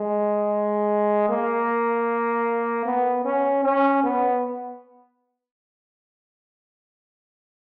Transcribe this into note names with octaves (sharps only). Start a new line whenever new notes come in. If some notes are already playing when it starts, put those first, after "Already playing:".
Already playing: G#3
A#3
B3
C#4
C#4
B3